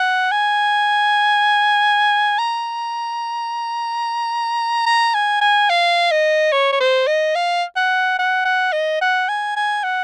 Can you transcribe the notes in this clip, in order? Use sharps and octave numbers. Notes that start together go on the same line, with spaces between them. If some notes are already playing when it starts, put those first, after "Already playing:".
Already playing: F#5
G#5
A#5
A#5
G#5
G#5
F5
D#5
C#5
C#5
C5
D#5
F5
F#5
F#5
F#5
D#5
F#5
G#5
G#5
F#5